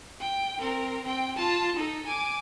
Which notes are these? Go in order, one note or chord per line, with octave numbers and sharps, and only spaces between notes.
G5
C4 A#4
C4 G5
F4 A5
D#4 A4
G#5 D6